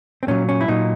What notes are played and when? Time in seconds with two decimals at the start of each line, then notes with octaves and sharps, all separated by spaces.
0.23 C4
0.28 A#2 F#3 C#4
0.49 C#4
0.61 E4
0.68 A#2 F#3 D#4